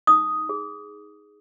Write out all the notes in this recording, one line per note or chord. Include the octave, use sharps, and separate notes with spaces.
D#4 D#6
G#4